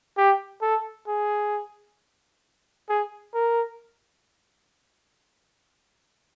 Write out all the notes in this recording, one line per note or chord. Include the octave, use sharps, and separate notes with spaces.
G4
A4
G#4
G#4
A#4